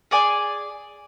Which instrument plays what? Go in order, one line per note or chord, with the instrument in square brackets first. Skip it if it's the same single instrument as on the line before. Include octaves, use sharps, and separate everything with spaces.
[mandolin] G#4 D5 G#5